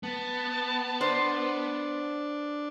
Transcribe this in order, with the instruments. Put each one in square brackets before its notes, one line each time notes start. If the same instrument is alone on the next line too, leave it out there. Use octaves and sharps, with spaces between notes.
[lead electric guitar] B3 [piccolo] A5
[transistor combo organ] D4 [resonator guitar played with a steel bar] C5